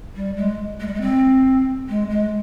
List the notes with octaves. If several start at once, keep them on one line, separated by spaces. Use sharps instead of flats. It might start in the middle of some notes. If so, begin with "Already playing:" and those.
G3
G#3
G#3
G3
G#3
C4
G#3
G#3